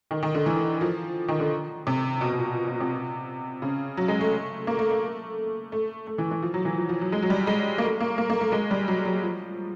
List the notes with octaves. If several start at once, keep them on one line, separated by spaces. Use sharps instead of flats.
D#3
D#3
D3
E3
F3
D#3
D3
C3
B2
B2
A#2
B2
C3
C#3
F#3
G#3
A3
A#3
A3
A3
A3
A3
E3
E3
F3
F#3
E3
F3
F3
F#3
G#3
F#3
G3
G#3
A#3
A3
A#3
A#3
A#3
A3
G#3
G3
F#3
F#3
F3